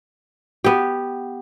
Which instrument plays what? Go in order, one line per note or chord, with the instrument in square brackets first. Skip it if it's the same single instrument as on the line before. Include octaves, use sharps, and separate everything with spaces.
[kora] B3 G4